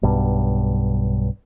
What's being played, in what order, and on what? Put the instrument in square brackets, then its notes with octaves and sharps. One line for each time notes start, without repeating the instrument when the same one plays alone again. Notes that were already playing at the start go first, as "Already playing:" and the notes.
[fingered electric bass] B1 G2